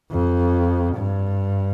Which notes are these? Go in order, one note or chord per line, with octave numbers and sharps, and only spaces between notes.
F2
G2